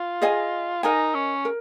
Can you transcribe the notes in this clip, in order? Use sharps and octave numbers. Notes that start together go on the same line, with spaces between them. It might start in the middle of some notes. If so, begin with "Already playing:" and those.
Already playing: F4
G#4 D#5 G#5
D#4 A#4 D#5 G#5
C#4
A#4